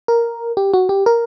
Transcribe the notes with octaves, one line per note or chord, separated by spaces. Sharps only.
A#4
G4
F#4
G4
A#4